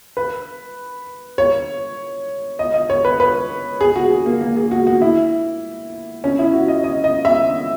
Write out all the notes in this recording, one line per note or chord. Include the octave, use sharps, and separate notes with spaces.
B4
C#5
D#5
D#5
C#5
B4
B4
G#4
F#4
G#4
A#3
A#3
G#4
F#4
F#4
E4
C#4
E4
F#4
D#5
D#5
D#5
E5